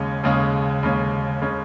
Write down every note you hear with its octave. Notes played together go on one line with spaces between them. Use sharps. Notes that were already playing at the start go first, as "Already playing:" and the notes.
Already playing: D#2 C#3 G#3 C#4
D#2 C#3 G#3 C#4
D#2 C#3 G#3 C#4
C#3 G#3 C#4